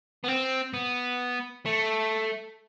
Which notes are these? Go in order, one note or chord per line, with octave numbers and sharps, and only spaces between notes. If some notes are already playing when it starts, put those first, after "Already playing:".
B3
C4
B3
A3